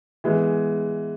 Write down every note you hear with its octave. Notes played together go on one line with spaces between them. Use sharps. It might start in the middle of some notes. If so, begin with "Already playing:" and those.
E3 G#3 B3